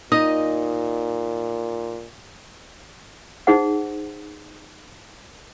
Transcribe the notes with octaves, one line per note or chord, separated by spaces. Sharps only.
A#2 D#4 D#5
D#4 G#4 C5 F#5